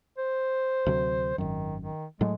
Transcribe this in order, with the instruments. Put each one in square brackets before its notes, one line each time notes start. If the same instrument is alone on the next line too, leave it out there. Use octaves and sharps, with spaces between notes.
[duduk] C5
[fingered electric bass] D2 C3 F#3
[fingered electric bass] G#1 F#2 [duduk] D#3
[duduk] D#3
[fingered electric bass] A2 F#3 A3 [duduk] G#3